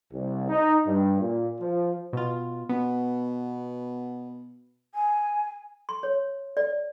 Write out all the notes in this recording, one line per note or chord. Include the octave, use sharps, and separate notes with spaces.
C2
D#4
G2
A#2
F3
B2 F4
B2 B3
G#5
C6
C#5
D5